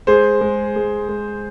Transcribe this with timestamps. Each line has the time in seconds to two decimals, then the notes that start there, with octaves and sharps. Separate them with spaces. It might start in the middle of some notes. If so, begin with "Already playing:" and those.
0.07 G#3 G#4 C5
0.41 G#3
0.76 G#3
1.09 G#3